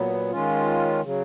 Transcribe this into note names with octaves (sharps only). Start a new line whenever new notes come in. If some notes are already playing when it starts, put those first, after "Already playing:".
Already playing: A#2 F#3 B3
D#3 G#3 C#4 F4
C#3 F#3